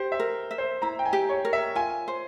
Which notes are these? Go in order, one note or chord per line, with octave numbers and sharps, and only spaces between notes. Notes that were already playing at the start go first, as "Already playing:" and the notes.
Already playing: G4 C5
E5
A#4
E5
C5
E4 A#5
G5
G#5
G4
C#5
A#4
E5
F4 G#5
C5